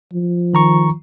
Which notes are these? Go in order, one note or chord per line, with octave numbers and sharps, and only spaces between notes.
F3
D#3 A#5 C#6